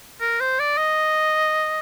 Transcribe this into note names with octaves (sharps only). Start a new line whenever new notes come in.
A#4
C5
D5
D#5